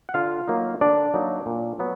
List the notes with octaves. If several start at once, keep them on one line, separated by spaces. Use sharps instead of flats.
F#5
D3 F4 F5
F#3 A#3 D#4
D3 D4 D5
F#3 A#3 D#4
A#2
F#3 B3